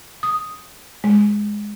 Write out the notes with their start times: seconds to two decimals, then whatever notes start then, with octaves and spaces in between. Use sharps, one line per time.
0.23 D#6
1.04 G#3